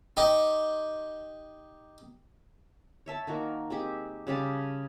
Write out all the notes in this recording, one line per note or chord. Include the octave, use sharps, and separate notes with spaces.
D#4 G4
C#5 E5 A5
D#3 A#3 F#4
G#3 C4 G4
C#3 G3 G4 A5